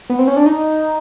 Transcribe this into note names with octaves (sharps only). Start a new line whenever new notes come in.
B3
C4
C#4
D4
D#4